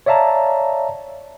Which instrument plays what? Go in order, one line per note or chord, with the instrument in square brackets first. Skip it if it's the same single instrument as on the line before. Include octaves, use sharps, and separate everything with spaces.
[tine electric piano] C#5 D5 E5 F5 A5 A#5